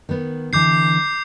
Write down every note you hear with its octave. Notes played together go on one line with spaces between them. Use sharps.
D#3 B3
D3 E3 D6 G6 C7